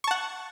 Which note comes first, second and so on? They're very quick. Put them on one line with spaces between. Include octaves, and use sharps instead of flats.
C#6 A5 F#5